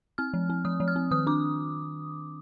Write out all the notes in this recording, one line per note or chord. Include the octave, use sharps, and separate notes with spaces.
C4 F6
F3
C4
F3 D#6
F3
F6
C4
D#3 D#6
D4 D6